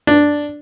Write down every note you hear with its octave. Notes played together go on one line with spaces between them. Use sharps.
D4